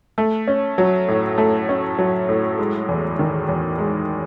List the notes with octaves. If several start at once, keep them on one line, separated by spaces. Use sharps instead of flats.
A3
C#4
F#3
A2
A3
C#4
F#3
A2
G#3
E2
D#3
E2
G#3